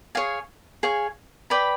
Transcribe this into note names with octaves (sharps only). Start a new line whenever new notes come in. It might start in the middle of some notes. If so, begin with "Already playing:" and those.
G#4 C#5 F5 G#5
G#4 C#5 F5 G#5
B4 D5 G5 B5